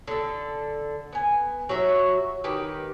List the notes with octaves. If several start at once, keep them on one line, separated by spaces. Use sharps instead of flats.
D3 A4
B3 G#5
F#3 F#4 E5
D#3 G4 B4